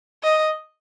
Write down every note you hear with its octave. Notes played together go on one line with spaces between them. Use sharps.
D#5